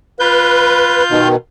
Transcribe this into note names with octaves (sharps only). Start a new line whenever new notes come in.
F4 B4 G6
B2 D#3